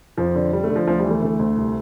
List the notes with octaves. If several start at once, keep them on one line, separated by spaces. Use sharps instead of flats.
F2 F3
D3
D3 G3
A3
D3
F3
D2 F3
G3
E3
A3
D2 A3
D2
C2